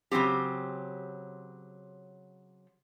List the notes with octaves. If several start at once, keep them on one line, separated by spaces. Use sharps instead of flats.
C#3 E3 F#3 C4 G4